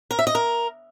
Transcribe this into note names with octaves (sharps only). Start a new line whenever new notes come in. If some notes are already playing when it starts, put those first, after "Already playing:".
A#4
E5
D#5
A#4